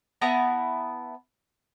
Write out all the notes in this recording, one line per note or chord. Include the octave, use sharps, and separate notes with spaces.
B3 E4 A5 A#5